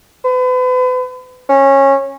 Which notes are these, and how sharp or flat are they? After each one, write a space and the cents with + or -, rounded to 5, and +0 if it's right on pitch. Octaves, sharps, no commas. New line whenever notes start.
B4 +40
C#4 -20